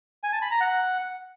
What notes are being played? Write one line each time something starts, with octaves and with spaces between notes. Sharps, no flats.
G#5
A5
B5
A#5
F#5